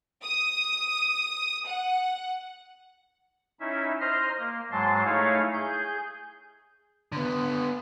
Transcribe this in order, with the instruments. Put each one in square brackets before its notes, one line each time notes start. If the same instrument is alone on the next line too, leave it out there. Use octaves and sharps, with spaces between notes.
[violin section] D#6
F#5
[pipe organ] C#4 D#4 E4 E5
C5 D#5 A#5 C6 F6
A#3
G#2 F#3 G#3 A5 C6
A3 D#4 E4 G#4 C#5 F5
G#4 G6
[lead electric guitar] D3 B3